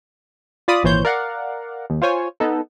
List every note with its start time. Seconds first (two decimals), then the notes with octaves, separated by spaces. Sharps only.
0.68 F4 D5 B5 D#6
0.83 G#1 A#2 E3 C5 C#5 G6
1.05 A#4 D5 F5 F#5
1.90 D#2
2.02 F4 C5 C#5 G#5
2.40 B3 D#4 A4